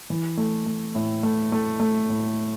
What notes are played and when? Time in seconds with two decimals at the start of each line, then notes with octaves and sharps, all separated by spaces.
0.10 E3
0.37 A3
0.66 A3
0.95 A2
1.23 A3
1.52 A3
1.80 A3
2.09 A2